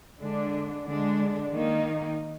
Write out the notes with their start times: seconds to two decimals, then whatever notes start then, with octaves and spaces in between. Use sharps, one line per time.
0.20 D3 G#3 D4
0.86 D3 G#3 D4
1.51 D#3 A#3 D#4